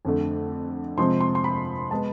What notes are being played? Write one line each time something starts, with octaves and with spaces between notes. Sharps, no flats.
F2 D3 A3
C3 F3 G#3 C4 C6
C6
C6
B5
G#3 B3 A5